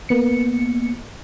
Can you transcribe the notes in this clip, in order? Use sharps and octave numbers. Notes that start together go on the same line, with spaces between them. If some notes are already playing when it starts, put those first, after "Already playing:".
A#3 B3 C#7